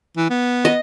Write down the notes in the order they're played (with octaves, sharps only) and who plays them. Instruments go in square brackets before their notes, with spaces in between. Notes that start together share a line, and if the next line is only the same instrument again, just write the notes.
[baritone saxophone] E3
B3
[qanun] D#5